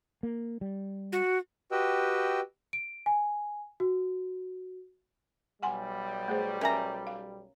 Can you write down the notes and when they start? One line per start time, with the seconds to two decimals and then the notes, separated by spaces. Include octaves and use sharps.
0.23 A#3
0.61 G3
1.12 F#4
1.72 F#4 G4 B4 D#5 G5 E6
2.73 D7
3.06 G#5
3.80 F#4
5.62 B1 G3 F#5 G#5 C6
6.28 A3 G#4 C5
6.61 C#4 A#4 E5 G#5 A#5
7.07 F5